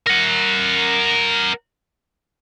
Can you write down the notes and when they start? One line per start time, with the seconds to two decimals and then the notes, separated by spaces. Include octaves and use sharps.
0.07 A#4 F#5